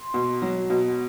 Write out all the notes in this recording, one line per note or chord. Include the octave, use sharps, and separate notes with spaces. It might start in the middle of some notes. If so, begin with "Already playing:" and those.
Already playing: C6
B2
F#3
B2